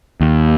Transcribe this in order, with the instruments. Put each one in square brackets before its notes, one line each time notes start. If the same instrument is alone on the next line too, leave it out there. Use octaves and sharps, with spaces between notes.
[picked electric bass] D#2